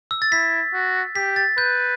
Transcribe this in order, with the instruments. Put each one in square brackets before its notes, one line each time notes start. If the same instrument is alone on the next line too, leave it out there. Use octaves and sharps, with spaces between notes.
[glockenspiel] E6
A6
[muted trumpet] E4 [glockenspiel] B6
[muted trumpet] F#4
[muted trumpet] G4 [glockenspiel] B6
[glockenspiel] A6
[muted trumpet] B4 [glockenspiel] G6